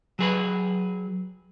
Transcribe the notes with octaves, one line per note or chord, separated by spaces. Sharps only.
F#3 G#4 B4